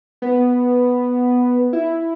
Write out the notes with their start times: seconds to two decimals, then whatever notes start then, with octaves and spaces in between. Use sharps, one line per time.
0.22 B3
1.73 E4